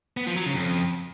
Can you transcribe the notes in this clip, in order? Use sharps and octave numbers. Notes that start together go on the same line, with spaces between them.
B3
F3
F#3
C#3
F2